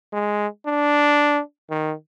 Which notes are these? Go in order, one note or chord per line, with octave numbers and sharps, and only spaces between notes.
G#3
D4
D#3